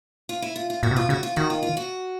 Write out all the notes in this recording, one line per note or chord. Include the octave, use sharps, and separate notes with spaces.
F4
E4
F4
F4
A#2 F#4
C3
B2 F4
C#3 F#4
F4
D#3 F#4
F4
F4
F#4